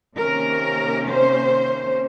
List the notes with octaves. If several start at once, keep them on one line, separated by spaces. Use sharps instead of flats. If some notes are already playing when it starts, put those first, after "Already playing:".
C3 D#3 A#3 C#4 A#4
C5